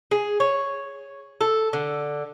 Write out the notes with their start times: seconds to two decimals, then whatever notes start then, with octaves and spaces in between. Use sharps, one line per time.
0.11 G#4
0.40 C#5
1.41 A4
1.73 D3